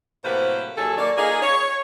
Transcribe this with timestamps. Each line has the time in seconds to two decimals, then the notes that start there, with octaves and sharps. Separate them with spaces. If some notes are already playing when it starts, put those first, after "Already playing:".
0.24 A2 C3 F#3 A#3 B4 C5
0.77 D#2 F#3 G#4 A4
0.97 A#3 C#5 D5
1.17 A#3 D#4 F4 G#4
1.41 C#5